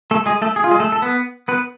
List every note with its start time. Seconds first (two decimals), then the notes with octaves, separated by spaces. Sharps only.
0.11 A3 A4
0.26 G#3 G#4
0.42 A3 A4
0.56 G#4
0.64 F4
0.71 G#3 G#4
0.80 A3 A4
0.92 A4
1.02 B3 B4
1.48 B3 B4